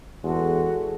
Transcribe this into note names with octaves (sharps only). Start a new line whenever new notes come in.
E2 G#3 F#4 A4